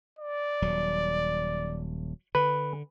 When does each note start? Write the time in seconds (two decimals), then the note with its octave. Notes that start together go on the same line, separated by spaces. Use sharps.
0.19 D5
0.62 D#1 F#3
2.35 D3 B4